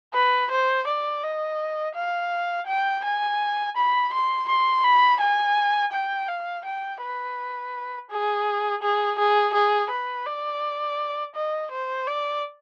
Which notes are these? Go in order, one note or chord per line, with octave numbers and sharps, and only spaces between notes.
B4
C5
D5
D#5
F5
G5
G#5
B5
C6
C6
B5
G#5
G5
F5
G5
B4
G#4
G#4
G#4
G#4
B4
D5
D#5
C5
D5